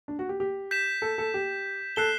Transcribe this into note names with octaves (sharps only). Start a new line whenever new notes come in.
D4
F#4
G4
G4
G6 B6 E7
A4
A4
G4
A4 F#6 C7 E7 G7